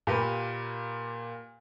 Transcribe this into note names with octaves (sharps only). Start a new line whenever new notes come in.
A#2 A#3 G4 B4